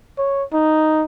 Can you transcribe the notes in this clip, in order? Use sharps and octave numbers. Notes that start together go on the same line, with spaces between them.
C#5
D#4